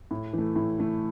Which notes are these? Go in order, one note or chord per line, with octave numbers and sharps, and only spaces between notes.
A2
E3
A3
A2
E3 A3